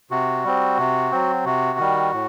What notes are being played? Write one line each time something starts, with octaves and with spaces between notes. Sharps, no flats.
C3 F#4
G3 C4
C3
F#3 C4
C3 F#4
D#3 G3
A2